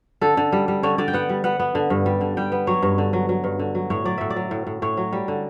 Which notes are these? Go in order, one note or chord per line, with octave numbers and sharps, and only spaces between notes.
D3 A4
D3
G3
G3
D3 C#5
D3 D5
G5
B3 F#5
G3
B3 F#5
B3
D3
G2
G3
D3
G3 G5
B3
F#3 C#5
G2
D3
F#3
F#3
G2
D3
F#3
A2 C#5
F#3 D5
A2 E5
D5
F#3
A2
A2
A2 C#5
F#3
G3
D3